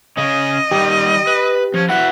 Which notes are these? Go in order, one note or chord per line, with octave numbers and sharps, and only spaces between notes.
C#3 C#4 D#5
D#3 G3 G4
B4
F3 C#4
E4 F#4 B4 E5 F#5